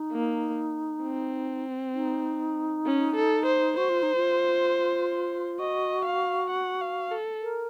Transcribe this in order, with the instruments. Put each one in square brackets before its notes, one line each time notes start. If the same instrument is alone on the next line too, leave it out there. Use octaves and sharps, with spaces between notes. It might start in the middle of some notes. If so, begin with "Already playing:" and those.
Already playing: [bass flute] D#4
[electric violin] A#3
C4
[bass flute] D#4
[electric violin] C#4
A4
C5
[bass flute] F#4 [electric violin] C5
[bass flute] F4
D#4
F4
[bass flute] F#4 [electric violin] D#5
[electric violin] F5
F#5
F5
A4
[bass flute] A#4